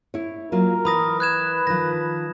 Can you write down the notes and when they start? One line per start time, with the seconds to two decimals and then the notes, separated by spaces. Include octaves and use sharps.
0.14 E4 C#5
0.52 F#3 A#3 F4 A#4
0.85 E3 B5 D#6 A#6
1.20 B4 F#6 G#6 E7
1.67 D#3 F3 A#6